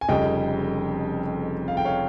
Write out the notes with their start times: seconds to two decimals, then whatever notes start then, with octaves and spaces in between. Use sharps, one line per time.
0.01 G#5
0.08 F1 F2 C#3 G3 D#5 G5
1.68 F5
1.77 G5
1.85 C#5 F5